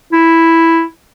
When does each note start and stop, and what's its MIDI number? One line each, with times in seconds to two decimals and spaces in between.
0.13 0.85 64